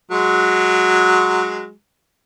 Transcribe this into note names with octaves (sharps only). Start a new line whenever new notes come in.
F#3 G#3